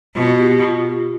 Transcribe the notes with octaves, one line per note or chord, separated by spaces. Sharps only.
B2 F4
G4
F4